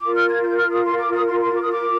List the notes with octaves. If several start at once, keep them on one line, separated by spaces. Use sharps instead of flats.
F4 A#4 D6
F6
G#6
G6
F6
D#6
C6
D6
D#6
C6
C6
D6
D#6
D6